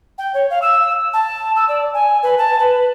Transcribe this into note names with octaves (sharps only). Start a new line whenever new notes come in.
G5
C#5
F5
E6
A5
E6
D5
G#5
B4
A5
B4